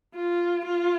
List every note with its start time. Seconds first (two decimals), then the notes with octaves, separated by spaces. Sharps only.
0.15 F4
0.65 F4